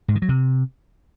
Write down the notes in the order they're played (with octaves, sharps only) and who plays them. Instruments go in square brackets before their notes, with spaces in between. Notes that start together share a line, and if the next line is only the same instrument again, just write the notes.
[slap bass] G#2
D#3
F#3
C3